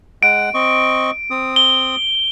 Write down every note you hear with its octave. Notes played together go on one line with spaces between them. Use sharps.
G#3 F#5 D7
C4 D#5 C#6
C4 D#6
G7